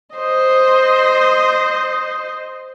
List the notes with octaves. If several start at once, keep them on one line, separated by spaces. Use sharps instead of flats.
C5 D#5